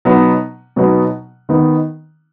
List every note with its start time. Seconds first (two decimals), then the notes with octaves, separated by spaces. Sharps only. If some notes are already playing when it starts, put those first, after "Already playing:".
0.05 B2 F#3 B3 D#4
0.76 B2 F#3 B3 D#4
1.49 D#3 B3 D#4